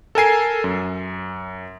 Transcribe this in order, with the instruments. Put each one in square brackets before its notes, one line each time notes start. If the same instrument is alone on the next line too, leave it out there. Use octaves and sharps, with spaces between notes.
[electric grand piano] A4 A#4 G#5 C7
F#2